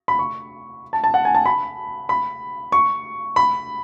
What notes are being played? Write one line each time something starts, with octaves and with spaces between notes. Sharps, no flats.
B5
C#6
A5
A5
F#5
G#5
A5
B5
B5
C#6
B5